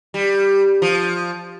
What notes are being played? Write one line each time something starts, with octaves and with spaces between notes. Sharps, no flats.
G3
F3